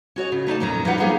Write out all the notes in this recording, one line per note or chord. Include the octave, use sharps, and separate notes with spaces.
C#4 F#4 C#5 D#5
C#3
A3 D#4 D5 A5
F2 A#2 F#3 C#4 A4 A#5
F3 G3 D#4 F4 B4 F#5
G3 A#3 B3 D#4 G#4 F5